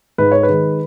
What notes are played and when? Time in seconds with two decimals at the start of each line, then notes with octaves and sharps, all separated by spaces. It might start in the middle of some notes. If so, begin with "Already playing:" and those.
0.18 G#2 B4
0.32 C#5
0.43 B4
0.49 D#3 G#3